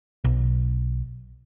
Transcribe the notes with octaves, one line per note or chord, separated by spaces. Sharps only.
B1